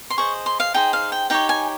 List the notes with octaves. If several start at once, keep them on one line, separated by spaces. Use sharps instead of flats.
C6
G#4 C5 D#5 C#6
C6
F5
D#4 G#4 C5 G5
F5
G5
D#4 G4 C#5 G5
G#5